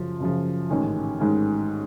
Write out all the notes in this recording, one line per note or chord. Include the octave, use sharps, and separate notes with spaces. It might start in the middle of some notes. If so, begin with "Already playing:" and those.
Already playing: F#2 C#3 F3
F#2 C#3 F3
A1 G#2 D#3 G#3 C#4
A1 G#2 D#3 G#3 C#4